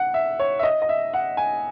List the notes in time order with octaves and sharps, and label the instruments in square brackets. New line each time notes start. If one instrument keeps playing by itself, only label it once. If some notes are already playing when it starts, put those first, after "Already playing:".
Already playing: [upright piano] F#5
E5
C#5
E5
D#5
D#5
E5
F#5
G#5